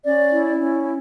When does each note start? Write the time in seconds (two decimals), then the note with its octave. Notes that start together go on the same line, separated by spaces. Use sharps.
0.04 C#4 D5
0.31 E4
0.59 C#4